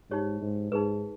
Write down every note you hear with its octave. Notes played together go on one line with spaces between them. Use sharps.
G#2 D#4 G4 C#5
G#2
G#2 D#4 G#4 B4